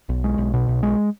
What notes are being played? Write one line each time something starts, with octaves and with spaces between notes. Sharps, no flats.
B1
G#3
B1
B2
B1
G#3